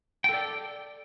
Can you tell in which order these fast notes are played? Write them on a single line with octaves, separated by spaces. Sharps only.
G5 A4 D5